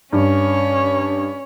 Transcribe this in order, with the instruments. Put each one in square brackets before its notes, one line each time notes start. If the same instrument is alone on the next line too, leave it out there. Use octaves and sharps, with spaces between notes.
[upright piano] G2 [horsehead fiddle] C#4 C#5